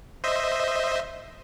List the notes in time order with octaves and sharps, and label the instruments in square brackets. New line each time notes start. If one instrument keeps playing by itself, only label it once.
[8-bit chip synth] C5 D#5 E5